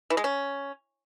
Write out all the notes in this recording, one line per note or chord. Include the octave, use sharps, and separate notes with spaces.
E3
G#3
C#4